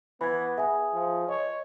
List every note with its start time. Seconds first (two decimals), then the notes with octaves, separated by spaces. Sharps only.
0.21 E3 B3 B5 G#6
0.58 G#4 E5 G#5
0.94 F3
1.29 C#5 D#5